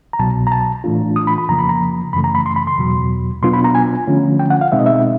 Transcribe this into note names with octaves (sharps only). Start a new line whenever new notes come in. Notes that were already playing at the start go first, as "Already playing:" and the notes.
A#5
C2 B2 F#3 A5
A#5
A5
A2 E3 A3 D4 F4
D#6
B5
B5
F2 C#3 F3 A#3 A#5
B5
A#5
F#2 C#3 E3 A3 B5
A#5
B5
C6
B5
C6
E2 B2 F#3
B2 F#3 B3 D4 F4 C6
B5
A#5
G#5
D3 F3 A3 C#4 F4
G5
F#5
F5
B2 G#3 C4 D#4 E5
D#5
E5